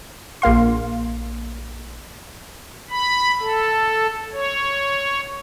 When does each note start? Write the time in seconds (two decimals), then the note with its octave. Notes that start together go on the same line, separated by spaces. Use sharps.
0.42 A#1 A#3 F5 C6
2.90 B5
3.40 A4
4.32 C#5